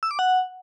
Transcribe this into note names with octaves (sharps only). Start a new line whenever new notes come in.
E6
D6
F#5